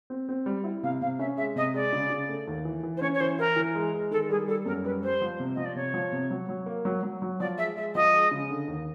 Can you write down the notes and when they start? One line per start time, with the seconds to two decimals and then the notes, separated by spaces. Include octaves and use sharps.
0.10 C4
0.29 C4
0.46 G3
0.64 E4
0.83 C3 F5
1.01 C3 F5
1.19 C#4 E5
1.37 G#3 E5
1.56 C3 D#5
1.74 G#3 D5
1.93 C#3
2.10 C#3
2.29 A3
2.47 D#2
2.65 E3
2.83 E3
2.97 C5
3.01 C#4 C#5
3.14 C#5
3.20 E3 C5
3.39 E4 A#4
3.56 E3
3.75 G#3
3.94 G#3
4.11 D#3 A4
4.29 G3 G#4
4.48 G3 A4
4.66 F#2 A#4
4.84 G3 B4
5.03 G3 C5
5.22 F3
5.40 C3
5.54 F3 D#5
5.65 D5
5.75 C3 C#5
5.94 F3
6.12 C3
6.31 F#3
6.49 F#3
6.66 A#3
6.85 F#3
7.03 F#3
7.22 F#3
7.40 F3 D5
7.58 G#3 E5
7.77 G#3 E5
7.95 F3 D#5
8.13 G#3
8.31 C#3
8.50 D3
8.68 D#2